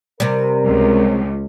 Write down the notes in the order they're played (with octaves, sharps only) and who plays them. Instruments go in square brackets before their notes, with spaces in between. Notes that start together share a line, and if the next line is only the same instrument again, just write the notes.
[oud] C3 G3 [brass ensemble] A#4
[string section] C#2